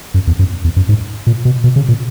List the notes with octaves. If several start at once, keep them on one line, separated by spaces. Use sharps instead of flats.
F#2
E2
F#2
E2
F#2
G#2
A#2
B2
B2
C#3
A#2